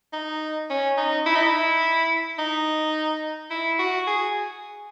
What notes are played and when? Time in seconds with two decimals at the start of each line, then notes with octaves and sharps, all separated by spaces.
0.13 D#4
0.70 C#4
0.97 D#4
1.26 E4
1.35 D#4
1.43 E4
2.39 D#4
3.51 E4
3.79 F#4
4.07 G#4